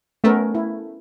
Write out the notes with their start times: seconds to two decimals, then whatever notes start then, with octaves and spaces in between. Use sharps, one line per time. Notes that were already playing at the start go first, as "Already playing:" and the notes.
0.24 A3 B3 C#4 A#4
0.55 E4